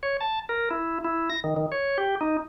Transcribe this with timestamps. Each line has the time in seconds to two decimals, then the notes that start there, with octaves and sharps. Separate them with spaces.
0.03 C#5
0.21 A5
0.49 A#4
0.71 E4
1.04 E4
1.30 A#6
1.44 D#3
1.56 D#3
1.72 C#5
1.98 G4
2.21 D#4